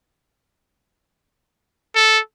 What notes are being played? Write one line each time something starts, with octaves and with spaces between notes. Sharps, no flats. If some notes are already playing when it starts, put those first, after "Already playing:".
A4